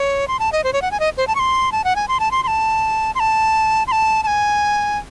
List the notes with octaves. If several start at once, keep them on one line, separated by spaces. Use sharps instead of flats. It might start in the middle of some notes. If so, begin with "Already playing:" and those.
Already playing: C#5
C6
A5
D#5
C5
C#5
F#5
G#5
D#5
C5
A5
C#6
C6
A5
F#5
G#5
C6
A5
C6
C6
A5
C6
A5
C6
A5
A5
G#5